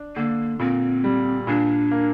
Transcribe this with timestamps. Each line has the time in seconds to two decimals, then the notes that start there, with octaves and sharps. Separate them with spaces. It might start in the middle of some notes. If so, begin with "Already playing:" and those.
Already playing: D4
0.16 D3 A#3
0.59 A#2 C4
1.04 G3
1.47 A#2 D4
1.91 A#3